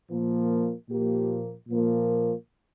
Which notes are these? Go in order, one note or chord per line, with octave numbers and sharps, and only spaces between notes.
A#2 F3 A#3
A#2 F3 A#3 G4
A#2 F3 A#3